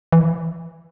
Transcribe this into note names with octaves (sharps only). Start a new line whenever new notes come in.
E3